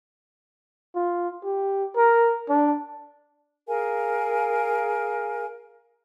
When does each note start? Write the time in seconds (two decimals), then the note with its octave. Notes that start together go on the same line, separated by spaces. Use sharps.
0.95 F4
1.44 G4
1.96 A#4
2.49 D4
3.67 G#4 A#4 F5 G#5